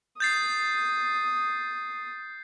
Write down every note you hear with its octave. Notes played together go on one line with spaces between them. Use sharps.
D#6 G6 A6 C7